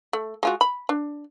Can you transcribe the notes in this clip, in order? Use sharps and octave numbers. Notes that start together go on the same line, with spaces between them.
A3
G#3 F4 F#4
B5
D4